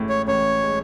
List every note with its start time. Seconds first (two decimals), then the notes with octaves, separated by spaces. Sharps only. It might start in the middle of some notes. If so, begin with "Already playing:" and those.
Already playing: A1 A2 G#3
0.09 C#5
0.27 A1 C#5
0.64 G#3